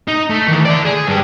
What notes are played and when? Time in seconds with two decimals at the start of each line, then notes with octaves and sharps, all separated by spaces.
0.08 D#4
0.30 A3
0.48 D#3 E3
0.65 D3 D5
0.85 G#4
1.07 G2 G4